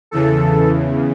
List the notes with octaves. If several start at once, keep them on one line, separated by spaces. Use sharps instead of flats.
E2 C#3 E3 A4